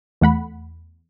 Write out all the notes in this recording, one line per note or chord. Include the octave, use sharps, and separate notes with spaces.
E2 A3 F#5 B5